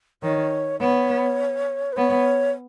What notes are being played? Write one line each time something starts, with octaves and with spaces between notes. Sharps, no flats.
D#3 C#5
B3 C#5
B4
B3 C#5